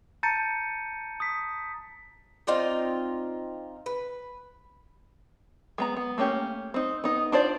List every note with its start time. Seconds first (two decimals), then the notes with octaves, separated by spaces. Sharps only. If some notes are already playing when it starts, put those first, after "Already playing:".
0.23 A5 A#5 G6 A6 C#7 D#7
1.20 D#6 B6
2.47 C4 D#4 F4 D5
3.86 B4
5.78 G#3 B3 A#5
5.97 B3
6.18 A3 A#3 C#4 G4
6.74 C4 D#4
7.04 B3 D#4
7.32 D4 F4 C5 D5